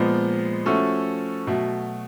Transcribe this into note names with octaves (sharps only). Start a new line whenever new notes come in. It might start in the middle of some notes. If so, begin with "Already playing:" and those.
Already playing: A#2 F3 G#3 B3
F3 A3 C#4 F#4 A4
B2 F#3 A3